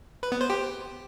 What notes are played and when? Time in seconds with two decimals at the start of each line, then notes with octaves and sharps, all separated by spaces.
0.23 B4
0.32 B3
0.41 C5
0.50 G4